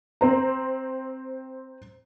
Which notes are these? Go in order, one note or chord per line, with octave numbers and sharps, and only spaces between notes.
C4 C5 A#5